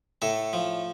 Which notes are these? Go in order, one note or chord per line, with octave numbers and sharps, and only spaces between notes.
A2 A4
F3